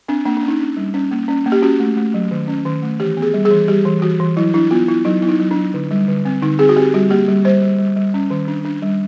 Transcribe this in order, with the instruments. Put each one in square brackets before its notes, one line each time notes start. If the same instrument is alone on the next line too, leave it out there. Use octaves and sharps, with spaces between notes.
[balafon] C4 D4
A#3 D4
D4
C#4
D#4
C#4
G3
C#4
A#3
C#4
A#3
G4
C#4 F#4
A3
A3
F#3
D#3
C#4
D#3
A3
E3 G4
B3
G#4
G3
G#4
E3
G3 G4
E3
E3 F#4
E3
F#3 E4
D4 E4
B3 F4
B3 E4
F#3 D#4
B3 E4
D#4
F#3
D4
F#3
D3
G3
D3
C4
D3 D#4
C4 G#4
F#4
C4 G4
G3 F#4
A#3 G4
G3
G3 C5
G3
G3
G3
C#4
D#3
D4
D4
G3